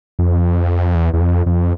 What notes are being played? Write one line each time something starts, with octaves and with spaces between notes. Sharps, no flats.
F2
E2
E2
F2
F2